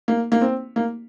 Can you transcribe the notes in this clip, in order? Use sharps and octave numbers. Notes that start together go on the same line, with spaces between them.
A#3
A#3
C4
A#3